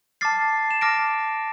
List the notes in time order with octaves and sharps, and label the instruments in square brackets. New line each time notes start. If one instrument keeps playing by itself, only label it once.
[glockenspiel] A5 D6 F6 A6 C7
E7
A5 D6 F6 A#6 D7